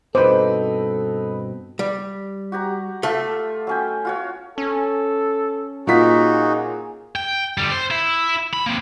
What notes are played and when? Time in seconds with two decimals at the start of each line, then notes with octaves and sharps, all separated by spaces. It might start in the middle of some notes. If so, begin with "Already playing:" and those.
0.15 G2 B2 C4 D#4 A4 B4 C5 D6
1.79 G3
2.52 F#4 G4 A#5
3.03 A3 F4 A4 E5
3.67 F#3 C#4 G5
4.05 F4 F#4 C#5
4.58 C#4 A4
5.87 A#2 D#4 F4 F#4 G#4 B6
7.16 G5
7.58 D3 G3
7.71 C5
7.91 E4 E5
8.53 B5
8.66 A#3 C4